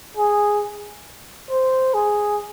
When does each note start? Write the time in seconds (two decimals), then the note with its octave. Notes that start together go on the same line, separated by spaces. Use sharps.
0.17 G#4
1.50 C5
1.94 G#4